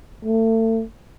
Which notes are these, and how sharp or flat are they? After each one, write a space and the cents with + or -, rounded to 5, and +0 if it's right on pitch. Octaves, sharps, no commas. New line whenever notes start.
A3 +35